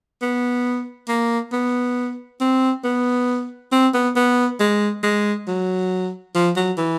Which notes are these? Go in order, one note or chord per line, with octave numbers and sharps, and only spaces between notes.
B3
A#3
B3
C4
B3
C4
B3
B3
G#3
G#3
F#3
F3
F#3
E3